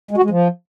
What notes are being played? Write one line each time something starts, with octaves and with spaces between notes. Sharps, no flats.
G#3
F#4
G#3
F3